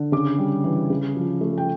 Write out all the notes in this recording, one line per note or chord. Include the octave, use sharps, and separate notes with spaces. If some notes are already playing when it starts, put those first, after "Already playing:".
Already playing: D3
C#3 D6
G3
E3
C#3
F3
A3
G5